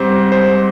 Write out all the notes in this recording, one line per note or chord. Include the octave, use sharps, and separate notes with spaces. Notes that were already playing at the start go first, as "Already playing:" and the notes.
Already playing: G#2 G3 C4 C5
C5